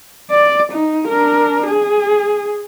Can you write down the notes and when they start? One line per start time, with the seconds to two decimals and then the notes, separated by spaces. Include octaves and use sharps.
0.31 D5
0.72 D#4
1.08 D4 A#4
1.67 G#4